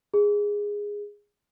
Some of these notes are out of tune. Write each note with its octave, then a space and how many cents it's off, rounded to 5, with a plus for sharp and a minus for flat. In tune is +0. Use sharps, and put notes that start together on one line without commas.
G#4 -10